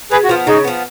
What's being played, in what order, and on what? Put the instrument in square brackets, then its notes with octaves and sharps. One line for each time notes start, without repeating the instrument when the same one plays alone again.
[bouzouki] C#3 [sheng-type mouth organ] G#4 B4
[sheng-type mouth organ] F#4
[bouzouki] F3 B3 [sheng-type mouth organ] F4
[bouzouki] C#3 [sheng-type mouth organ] D#4
[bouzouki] F3 B3